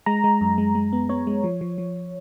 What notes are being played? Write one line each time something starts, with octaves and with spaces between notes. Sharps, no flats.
G#3 A#5
G#3
F#2
G#3
G#3
B3
B3 C#5
G#3
F3
F3
F3